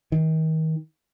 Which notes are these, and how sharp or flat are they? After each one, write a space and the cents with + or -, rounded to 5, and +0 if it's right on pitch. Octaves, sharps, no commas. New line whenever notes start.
D#3 +35